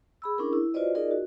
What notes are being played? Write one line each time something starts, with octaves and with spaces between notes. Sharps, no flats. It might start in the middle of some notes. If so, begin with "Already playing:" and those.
G#4 B5 E6
C#4 D4 E4 G#4 A#4
E4
F4 F#4 B4 C5 D5 D#5
D#4 F4 G#4 A#4 D5 D#5
F#4